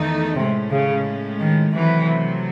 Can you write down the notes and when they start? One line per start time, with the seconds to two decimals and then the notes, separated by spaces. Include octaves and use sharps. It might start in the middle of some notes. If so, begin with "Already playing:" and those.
Already playing: E2 D#3 A3 D#4
0.36 A2 C3 G#3 C#4
0.71 C#3
1.39 D#3
1.73 C3 E3 F#3 A3